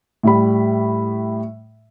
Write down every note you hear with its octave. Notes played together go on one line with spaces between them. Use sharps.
A2 G3 B5